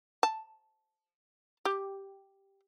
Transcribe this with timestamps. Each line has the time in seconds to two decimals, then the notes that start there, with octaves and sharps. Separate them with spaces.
0.23 A5
1.65 G4